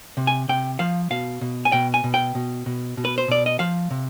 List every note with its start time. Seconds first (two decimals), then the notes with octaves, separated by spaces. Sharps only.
0.17 C3
0.27 G#5
0.49 C3 G5
0.79 F3 F5
1.10 B2 F5
1.41 B2
1.65 G#5
1.72 B2 G5
1.94 G#5
2.04 B2
2.14 G5
2.35 B2
2.66 B2
2.97 B2
3.05 B4
3.18 C5
3.28 B2 D5
3.46 D#5
3.59 F3 F5
3.91 C3